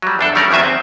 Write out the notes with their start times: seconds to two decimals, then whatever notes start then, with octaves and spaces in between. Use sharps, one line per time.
0.02 F#3 G3
0.19 E2 D4 A4
0.35 D#3 G3 A3 C#4 A#4 D5
0.51 E2 D#3 F#3 C4 E5 G#5
0.63 C4